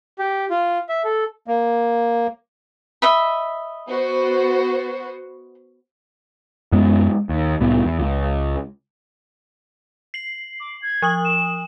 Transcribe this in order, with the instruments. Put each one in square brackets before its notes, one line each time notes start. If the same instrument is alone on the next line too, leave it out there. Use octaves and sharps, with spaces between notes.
[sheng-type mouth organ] G4
F4
E5
A4
[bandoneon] A#3
[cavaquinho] D#5 E5 B5
[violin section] B3 F#4 C5
[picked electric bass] F#2 G#3 B3
D#2
C2 A2 B3
E2
C#2
[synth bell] C7 F#7
[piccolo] D6
G#6
[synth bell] F3 D#6 F#7
[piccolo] E7